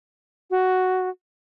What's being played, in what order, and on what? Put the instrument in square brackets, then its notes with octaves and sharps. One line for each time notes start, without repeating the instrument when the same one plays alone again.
[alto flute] F#4